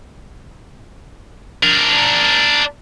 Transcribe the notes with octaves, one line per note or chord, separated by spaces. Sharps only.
D4 A#4